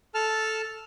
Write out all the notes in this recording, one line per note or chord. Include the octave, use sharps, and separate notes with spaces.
A4 A5 F6